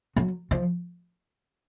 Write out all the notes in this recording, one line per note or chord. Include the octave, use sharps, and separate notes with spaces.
F#3
F3